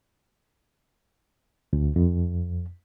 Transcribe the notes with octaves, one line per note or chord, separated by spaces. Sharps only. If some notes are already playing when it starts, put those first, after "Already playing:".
D2
F2